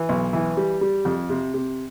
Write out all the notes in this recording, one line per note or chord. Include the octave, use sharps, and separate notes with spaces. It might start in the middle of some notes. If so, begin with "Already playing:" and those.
Already playing: E3
B1
E3
G3
G3
F2
C3
C3